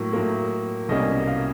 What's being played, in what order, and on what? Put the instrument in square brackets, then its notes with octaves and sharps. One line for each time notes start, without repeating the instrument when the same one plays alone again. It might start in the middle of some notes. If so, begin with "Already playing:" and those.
Already playing: [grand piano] A2 F#3 A#3
A2 F#3 A#3
C2 B2 G3 A#3 C#4 D#5
F5